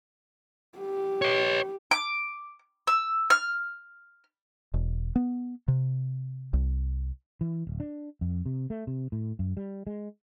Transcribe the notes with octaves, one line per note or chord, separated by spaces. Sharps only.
G4
B4 C#5
D6
E6
F6
E1
B3
C3
C2
E3
D1
D4
F2
C3
A3
C3
A2
F#2
G3
G#3